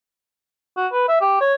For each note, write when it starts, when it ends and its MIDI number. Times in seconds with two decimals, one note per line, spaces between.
0.77 0.87 66
0.92 1.04 71
1.08 1.20 76
1.21 1.38 67
1.40 1.54 73